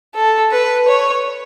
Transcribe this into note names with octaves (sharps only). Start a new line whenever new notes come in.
A4
B4
C#5